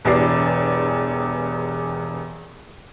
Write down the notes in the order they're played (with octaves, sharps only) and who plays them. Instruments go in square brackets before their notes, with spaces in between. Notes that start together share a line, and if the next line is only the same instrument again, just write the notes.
[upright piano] E1 E2 G2 G4 D5 C7